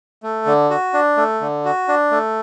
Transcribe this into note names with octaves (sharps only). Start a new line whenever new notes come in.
A3
D3
F#4
D4
A3
D3
F#4
D4
A3